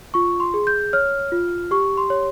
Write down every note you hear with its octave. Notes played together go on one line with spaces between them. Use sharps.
F4 C#6
C6
G#4
G6
C#5 F6
F4
G4 C#6
C6
C#5